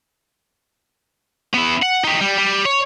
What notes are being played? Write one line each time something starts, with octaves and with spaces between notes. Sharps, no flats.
B3 E4
F#5
D#4 G4
G3
G3
C#5